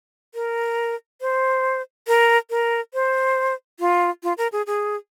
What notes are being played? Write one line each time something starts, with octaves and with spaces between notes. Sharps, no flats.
A#4
C5
A#4
A#4
C5
F4
F4
A#4
G#4
G#4